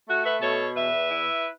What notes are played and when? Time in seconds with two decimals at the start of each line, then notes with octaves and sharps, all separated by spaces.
0.08 A3 F#4
0.24 B4 E5
0.42 B2 A4 C#5
0.76 E2 B4 E5
1.10 E4